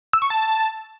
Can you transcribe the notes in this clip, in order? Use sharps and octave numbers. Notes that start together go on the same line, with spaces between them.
E6
C#6
A5